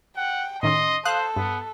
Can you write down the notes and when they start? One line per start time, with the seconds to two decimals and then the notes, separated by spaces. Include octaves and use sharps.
0.17 F#5 G5
0.63 A2 D#3 C#4 D#5 C6
1.05 A4 C5 F5 D#6 F#6
1.36 G2 B3